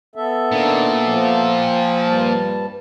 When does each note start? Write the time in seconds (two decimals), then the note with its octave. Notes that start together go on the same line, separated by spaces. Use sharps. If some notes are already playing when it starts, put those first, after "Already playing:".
0.16 B3 A4 E5
0.52 A#2 D#3 A#3 D4
1.08 F3
1.53 G5
2.06 G2 G3 A5